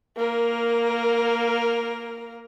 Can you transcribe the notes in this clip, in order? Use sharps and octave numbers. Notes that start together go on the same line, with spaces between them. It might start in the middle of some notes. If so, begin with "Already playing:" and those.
A#3 A#4